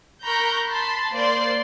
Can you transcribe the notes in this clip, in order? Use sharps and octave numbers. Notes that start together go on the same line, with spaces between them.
A#4 A#5 B5 C#6 F#6 G6
A5 B5 C6
A#3 C5 D5 C6